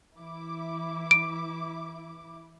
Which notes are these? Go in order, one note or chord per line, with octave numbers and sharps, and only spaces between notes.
E3 E4 D6
D7